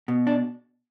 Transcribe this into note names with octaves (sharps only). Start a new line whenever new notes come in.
B2
D4